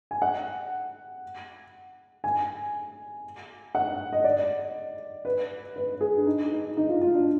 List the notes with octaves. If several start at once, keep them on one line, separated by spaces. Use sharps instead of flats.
G#5
F#5
G#5
F#5
D#5
D5
B4
B4
G#4
D4
D#4
D#4
D#4
F4
F4
D4